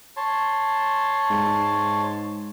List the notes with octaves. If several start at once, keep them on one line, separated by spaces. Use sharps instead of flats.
C#5 A5 C6
G#2